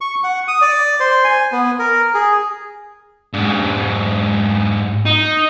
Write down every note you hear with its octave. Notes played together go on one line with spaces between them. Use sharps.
C#6
F#5
D#6
D5
C5
G#5
B3
A#4
G#4
G#2 D4
D#4